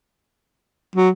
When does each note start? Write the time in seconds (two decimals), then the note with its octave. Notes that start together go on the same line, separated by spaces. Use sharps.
0.96 F#3